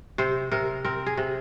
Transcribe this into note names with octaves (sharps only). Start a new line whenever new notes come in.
C3 C5
C3 A#4
C4 A#4
G#4
C3